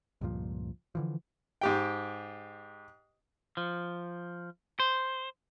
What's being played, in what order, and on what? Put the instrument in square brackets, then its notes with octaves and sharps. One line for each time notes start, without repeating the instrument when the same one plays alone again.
[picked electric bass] C#2 G2 A#2 F3
D3 E3 F3
[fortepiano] G#2 G4 G5
[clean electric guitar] F3
C5